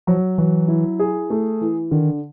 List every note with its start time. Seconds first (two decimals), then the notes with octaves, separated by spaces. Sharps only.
0.07 F3 F#3
0.38 E3 F#3
0.68 E4
0.99 G#4
1.30 A3
1.61 E3
1.91 D3 D#3